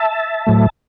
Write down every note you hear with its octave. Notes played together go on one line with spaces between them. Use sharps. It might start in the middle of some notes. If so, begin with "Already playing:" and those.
Already playing: E5 A5
A2 F#3 A3